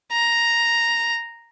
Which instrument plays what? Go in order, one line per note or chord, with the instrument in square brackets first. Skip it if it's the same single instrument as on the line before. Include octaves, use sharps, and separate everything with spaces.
[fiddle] A#5